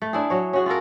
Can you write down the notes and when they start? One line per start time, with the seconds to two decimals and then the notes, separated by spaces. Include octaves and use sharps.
0.02 A3
0.13 D4 E4 G#4
0.30 F#3 C#5
0.53 C#4 F#4 G#4
0.66 F4 F#4 A4 A#4